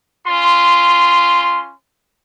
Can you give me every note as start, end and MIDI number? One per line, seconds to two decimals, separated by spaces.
0.27 1.72 61
0.27 1.72 65
0.27 1.72 84